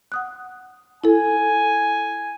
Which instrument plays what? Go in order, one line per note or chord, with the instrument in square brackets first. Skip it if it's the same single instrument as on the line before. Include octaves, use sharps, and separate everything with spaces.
[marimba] F#5 D#6 F#6
[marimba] E4 A4 [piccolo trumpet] G#5